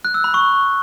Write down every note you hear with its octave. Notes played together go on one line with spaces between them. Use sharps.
F#6
E6
B5
C#6